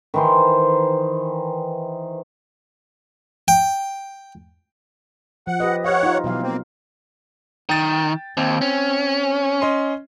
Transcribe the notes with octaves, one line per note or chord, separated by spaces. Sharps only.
D#3 E3 C5
G5
F3 F#5
G4 B4 D#5
G4 C#5 F5 F#5
D#4 F4
B2 E3 F#3 F5
A#3 C4
D#3 G5 A6
D#2 C4
C#4
C#4 D#5 C6